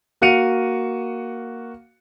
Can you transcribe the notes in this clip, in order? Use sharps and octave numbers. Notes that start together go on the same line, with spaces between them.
A#3 F#4 F5 C#7 D#7 F7